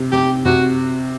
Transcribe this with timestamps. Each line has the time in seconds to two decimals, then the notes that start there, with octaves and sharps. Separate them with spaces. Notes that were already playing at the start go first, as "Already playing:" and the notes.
Already playing: C3
0.12 C3 G4
0.45 C3 F#4